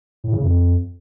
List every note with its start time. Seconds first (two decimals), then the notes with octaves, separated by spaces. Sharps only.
0.24 A2
0.33 C#3
0.42 F2